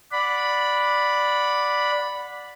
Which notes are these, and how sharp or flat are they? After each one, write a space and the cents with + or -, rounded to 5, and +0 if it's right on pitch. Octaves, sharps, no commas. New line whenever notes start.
D5 +0 F#5 -15 B5 +0